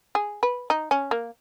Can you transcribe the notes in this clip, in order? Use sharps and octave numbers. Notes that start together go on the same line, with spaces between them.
G#4
B4
D#4
C#4
A#3